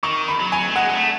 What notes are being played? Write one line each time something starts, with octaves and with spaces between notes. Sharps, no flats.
D#3 C#6
B5
F#3
G#5
A3
G#3 F#5
G#3
A3